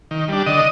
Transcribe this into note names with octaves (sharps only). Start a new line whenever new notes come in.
D#3
G3 D4
D3 D#5